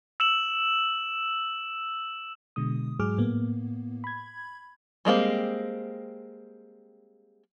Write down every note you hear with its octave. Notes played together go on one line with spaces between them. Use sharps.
E6 E7 F#7
B2 D3 G#3 D#6
G#2 F#3 G#3 G#4 D6 F6
A2 A#3 B3
B5 G#6
G3 G#3 A#3 C4